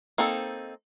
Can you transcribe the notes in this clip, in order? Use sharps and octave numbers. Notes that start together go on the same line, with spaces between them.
A#3 C4 D#4 A4